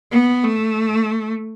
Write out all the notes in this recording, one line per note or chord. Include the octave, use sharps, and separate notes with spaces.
B3
A3